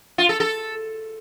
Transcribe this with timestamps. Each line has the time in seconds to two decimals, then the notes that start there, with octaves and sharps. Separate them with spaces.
0.18 F4
0.29 A4
0.40 A4